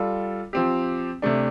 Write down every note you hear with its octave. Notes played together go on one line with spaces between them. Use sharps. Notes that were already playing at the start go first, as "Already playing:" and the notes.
Already playing: G3 F4 A4
F3 C4 G4
C3 A3 D4